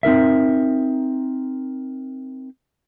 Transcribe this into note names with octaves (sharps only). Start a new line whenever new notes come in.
C4 D#4 A#4 E5